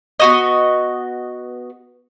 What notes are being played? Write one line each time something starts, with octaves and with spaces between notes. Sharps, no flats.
B3 F#4 D#5